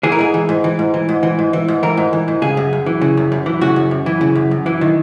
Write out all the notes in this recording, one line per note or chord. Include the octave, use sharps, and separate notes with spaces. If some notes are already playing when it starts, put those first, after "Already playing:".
E3 G#4
A#4
G#2 G#4
E3
G#2
E3
G#2
E3
G#2
E3
G#2
E3
G#2
E3 A#4
G#2
E3
G#2
C#3 G#4
F#2
F#2
E3
C#3
F#2
F#2
E3
C#3 F#4
F#2
F#2
E3
C#3
F#2
F#2
E3
D#3